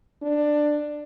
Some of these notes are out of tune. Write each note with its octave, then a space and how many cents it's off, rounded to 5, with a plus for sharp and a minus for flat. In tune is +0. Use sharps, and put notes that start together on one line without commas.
D4 +15